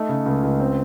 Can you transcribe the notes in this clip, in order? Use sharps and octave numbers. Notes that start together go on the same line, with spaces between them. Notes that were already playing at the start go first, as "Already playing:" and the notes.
Already playing: A3 D#4
C#3
C#2
C#2
C4